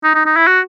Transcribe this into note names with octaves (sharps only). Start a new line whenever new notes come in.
D#4
D#4
D#4
E4
F#4